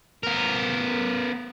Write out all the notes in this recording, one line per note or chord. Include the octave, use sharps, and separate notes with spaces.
B3 A#4